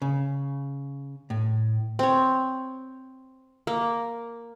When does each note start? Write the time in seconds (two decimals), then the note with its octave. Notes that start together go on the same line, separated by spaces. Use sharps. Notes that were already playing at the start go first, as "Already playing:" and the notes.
0.02 C#3
1.30 A2
1.99 C4 C#5
3.67 A#3